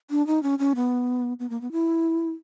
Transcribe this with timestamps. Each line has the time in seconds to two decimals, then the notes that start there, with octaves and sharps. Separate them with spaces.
0.11 D4
0.27 D#4
0.43 C#4
0.59 C#4
0.75 B3
1.39 B3
1.50 A#3
1.61 B3
1.72 E4